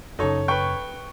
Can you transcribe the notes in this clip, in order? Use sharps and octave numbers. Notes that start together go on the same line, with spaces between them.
F#2 C#3 D#4 A4 C#5
B4 G5 C#6